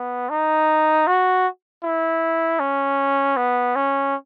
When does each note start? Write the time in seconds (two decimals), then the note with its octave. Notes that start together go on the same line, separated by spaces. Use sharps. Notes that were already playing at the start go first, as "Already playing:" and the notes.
Already playing: B3
0.30 D#4
1.07 F#4
1.83 E4
2.59 C#4
3.37 B3
3.75 C#4